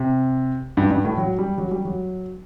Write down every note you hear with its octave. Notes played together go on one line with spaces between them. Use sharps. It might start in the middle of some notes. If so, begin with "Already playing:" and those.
Already playing: C3
G2
G2
A2
F#3
G3
F#3
G3
F#3